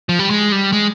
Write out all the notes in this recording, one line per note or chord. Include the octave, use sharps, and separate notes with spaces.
F3
G3
G#3
G3
G#3